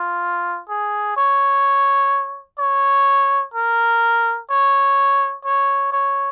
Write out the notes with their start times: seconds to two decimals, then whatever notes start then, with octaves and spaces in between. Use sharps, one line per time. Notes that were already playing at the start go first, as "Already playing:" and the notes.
Already playing: F4
0.69 G#4
1.17 C#5
2.59 C#5
3.54 A#4
4.50 C#5
5.45 C#5
5.92 C#5